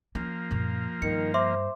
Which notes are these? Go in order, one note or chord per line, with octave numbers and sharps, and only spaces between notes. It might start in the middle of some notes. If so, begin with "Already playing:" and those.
F3 A#3 C#4
F#2 A#2
G2 D#3 C#7
C5 E5 C6 D6